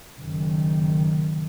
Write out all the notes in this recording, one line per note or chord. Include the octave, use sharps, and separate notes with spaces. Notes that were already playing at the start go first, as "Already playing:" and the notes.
F#1 D#3